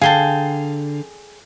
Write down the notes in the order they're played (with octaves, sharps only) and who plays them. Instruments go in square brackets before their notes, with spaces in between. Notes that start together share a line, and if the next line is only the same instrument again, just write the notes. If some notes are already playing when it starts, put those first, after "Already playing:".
[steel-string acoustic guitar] D3 [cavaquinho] G#4 G5 A5 [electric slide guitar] F5